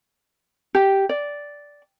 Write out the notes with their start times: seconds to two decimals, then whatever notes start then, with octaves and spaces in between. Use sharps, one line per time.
0.75 G4
1.09 D5